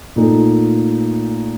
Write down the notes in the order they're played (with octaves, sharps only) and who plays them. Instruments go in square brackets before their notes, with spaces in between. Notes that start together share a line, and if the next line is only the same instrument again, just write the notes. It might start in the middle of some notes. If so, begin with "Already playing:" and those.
[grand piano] A#2 A3 D#4 A4